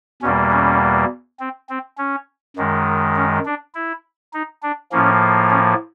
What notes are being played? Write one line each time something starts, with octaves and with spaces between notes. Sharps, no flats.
E2 B2 G3 A#3 C#4
C#4
C4
C4
C#4
F#2 D#3 G#3
C#4
D4
E4
D#4
D4
A2 F3 A#3 C#4
C#4